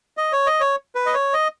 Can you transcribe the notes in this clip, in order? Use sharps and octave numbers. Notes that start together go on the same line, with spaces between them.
D#5
C#5
D#5
C#5
B4
D#5
C#5
D#5